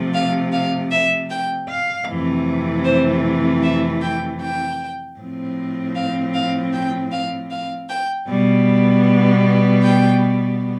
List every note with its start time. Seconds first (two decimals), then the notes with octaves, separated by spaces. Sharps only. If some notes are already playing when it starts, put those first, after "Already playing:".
Already playing: C3 F3 A3
0.14 F5
0.52 F5
0.91 E5
1.30 G5
1.68 F5
2.07 F2 C3 E3 A3
2.84 C5
3.63 E5
4.01 G5
4.40 G5
5.18 A2 F3 C4
5.95 F5
6.34 F5
6.73 G5
7.11 F5
7.51 F5
7.89 G5
8.28 B2 G3 B3
9.83 G5